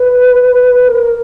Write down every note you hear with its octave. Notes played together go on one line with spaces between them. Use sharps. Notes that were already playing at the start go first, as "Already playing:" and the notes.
Already playing: B4
A#4